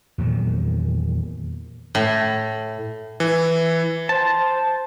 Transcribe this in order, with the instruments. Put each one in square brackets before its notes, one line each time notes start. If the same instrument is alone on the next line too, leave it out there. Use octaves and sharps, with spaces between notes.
[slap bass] E2 A#2 D#3 F#3
[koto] A2
[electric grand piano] E3
[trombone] C5 [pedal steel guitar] A5